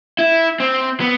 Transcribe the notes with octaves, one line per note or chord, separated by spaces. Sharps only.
E4
C4
B3